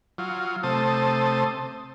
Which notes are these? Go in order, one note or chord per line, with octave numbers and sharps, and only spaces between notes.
F#3 F4
C3 A3 C5 A5 D#6